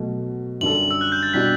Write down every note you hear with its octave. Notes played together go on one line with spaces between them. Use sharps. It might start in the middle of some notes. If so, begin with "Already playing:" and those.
Already playing: B2 F#3 A3
F#2 D3 G3 D4 A4 F#7
E6
F#6
G6
A6
B2 G3 D4 F#4 B6